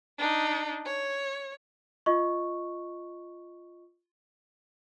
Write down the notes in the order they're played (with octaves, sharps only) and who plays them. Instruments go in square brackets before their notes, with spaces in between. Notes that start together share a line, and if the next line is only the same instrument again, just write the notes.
[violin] D4 D#4
C#5
[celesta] F4 D#5 C#6